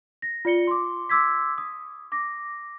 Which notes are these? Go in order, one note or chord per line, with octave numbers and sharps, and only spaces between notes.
A#6
F4 D5 C#7 G7
C6 D6
C6 D6 E6 G#6 B6
D#6
D6 A#6